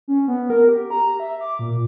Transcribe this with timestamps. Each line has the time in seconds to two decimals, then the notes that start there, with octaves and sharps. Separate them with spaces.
0.08 C#4
0.28 B3
0.50 A#4
0.69 G4
0.90 A#5
1.20 E5
1.41 D6
1.59 A#2